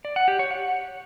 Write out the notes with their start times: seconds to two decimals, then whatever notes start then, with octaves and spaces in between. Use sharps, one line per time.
0.05 D5
0.16 F#5
0.28 G4
0.39 C#5
0.51 F#5